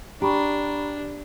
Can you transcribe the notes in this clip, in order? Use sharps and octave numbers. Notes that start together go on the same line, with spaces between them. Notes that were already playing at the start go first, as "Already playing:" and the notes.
D4 G4 A#5 B5 C#6